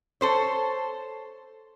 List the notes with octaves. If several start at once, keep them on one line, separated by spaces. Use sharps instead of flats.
A4 C5 C#5